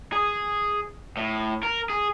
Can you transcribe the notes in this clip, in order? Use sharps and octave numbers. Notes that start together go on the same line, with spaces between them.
G#4
A2
A#4
G#4